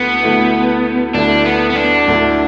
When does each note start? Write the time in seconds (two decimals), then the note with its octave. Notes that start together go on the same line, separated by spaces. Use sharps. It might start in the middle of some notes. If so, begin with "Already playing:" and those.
Already playing: D2 D3 A3 B3 E4
0.23 D2 D3 A3 E4 B4
1.14 D2 D3 A3 D4 E4
1.45 B3
1.70 B3
1.76 D4
2.08 D2 D3 A3 E4